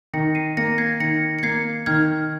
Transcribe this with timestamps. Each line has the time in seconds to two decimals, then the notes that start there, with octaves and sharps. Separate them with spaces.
0.13 D#3 A#6 C#7
0.35 C7 D#7
0.57 A#3 A#6 C#7
0.78 G#6 C7
1.00 D#3 A#6 C#7
1.39 C#7
1.43 A#3 G#6 C7
1.86 D#3 F6 G#6